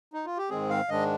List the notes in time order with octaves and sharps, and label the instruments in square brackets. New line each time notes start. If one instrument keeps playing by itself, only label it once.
[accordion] D#4
F4
G4
G#2 D#3 G#3 C4 G#4
F5
G#2 D#3 G#3 D4 D#5